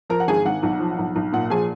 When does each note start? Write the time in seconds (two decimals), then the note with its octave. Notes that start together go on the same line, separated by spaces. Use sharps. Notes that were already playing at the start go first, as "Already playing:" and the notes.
0.10 F3 A#4 A#5
0.20 F#5
0.28 G#1 G#4 G#5
0.45 G#1 F#5
0.63 B1
0.80 F3
0.99 B1
1.16 B1
1.33 A#2 F#5
1.50 F3 G#4 G#5